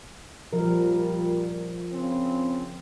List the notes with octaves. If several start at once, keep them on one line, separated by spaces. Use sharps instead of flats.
A#2 F3 G3 A#4
C#3 C4